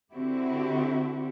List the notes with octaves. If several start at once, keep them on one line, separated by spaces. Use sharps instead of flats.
D3 C4 E4 F#4 G4